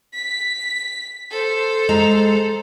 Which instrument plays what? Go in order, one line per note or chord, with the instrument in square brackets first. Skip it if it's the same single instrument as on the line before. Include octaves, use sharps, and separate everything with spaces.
[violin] B6
A4 C5
[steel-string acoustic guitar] G#3 A#5